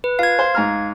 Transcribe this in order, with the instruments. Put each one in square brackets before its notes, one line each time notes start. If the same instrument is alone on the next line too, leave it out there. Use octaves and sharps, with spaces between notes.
[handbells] B4
[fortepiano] F4 [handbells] F5 G#6
[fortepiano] C5
G#2 A#5 F6